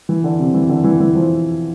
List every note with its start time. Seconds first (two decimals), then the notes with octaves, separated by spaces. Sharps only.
0.09 E3
0.24 D3
0.39 C3
0.54 E3
0.69 D3
0.84 E3
1.00 E3
1.15 F3